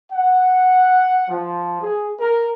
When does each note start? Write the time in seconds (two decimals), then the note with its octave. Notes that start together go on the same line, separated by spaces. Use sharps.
0.13 F#5
1.30 F3
1.82 G#4
2.20 A#4